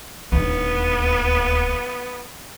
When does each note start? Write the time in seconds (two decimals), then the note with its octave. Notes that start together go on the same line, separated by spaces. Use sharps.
0.32 D1 D#2 B3